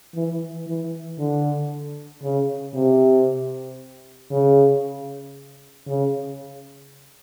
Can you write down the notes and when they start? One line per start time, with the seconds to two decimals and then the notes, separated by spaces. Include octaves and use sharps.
0.15 E3
0.67 E3
1.19 D3
2.22 C#3
2.75 C3
4.31 C#3
5.87 C#3